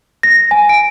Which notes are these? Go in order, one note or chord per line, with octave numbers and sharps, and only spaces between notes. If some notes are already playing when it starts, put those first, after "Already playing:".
A#6
G#5
D7